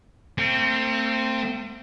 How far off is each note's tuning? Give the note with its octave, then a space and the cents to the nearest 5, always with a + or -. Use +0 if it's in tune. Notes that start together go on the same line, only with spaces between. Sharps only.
A3 +45 C4 +0